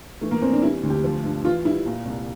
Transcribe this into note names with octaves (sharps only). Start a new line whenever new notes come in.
E3 A3
A#3
E2 C4
D4
G3 E4
D2
G4
F3
G2
E3 F4
G3 E4
A#2
C2